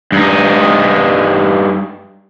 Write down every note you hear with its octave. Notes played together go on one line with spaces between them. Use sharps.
G2 D#4